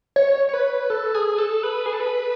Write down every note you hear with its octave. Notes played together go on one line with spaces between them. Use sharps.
C#5
C#5
B4
A4
G#4
A4
B4
G#4
A4
B4